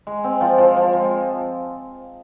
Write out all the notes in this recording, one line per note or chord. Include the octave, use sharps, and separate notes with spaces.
G#3
C4
F3
F3
F3
G#3